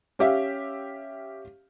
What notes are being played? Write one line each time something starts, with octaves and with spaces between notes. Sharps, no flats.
C#4 G4 E5 F5